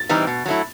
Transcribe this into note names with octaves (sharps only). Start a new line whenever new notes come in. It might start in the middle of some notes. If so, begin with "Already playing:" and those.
Already playing: A6
E3 G3 C4 D#4
B2
F#3 A3 E4